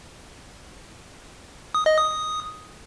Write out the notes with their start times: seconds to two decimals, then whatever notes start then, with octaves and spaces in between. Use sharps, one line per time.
1.75 D#6
1.86 D#5
1.98 D#6